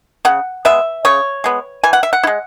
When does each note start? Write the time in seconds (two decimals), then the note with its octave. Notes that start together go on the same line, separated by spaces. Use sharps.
0.25 C#3 F#5
0.65 G#3 B3 E5
1.05 C#3 C#5
1.44 G#3 B3
1.84 E3 G#5
1.93 F#5
2.03 E5
2.13 F#5
2.23 E4
2.27 G#3